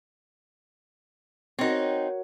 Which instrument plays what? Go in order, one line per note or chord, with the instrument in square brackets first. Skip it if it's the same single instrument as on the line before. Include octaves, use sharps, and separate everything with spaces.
[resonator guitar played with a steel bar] C4 D#4 [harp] F#4 A#4 C#5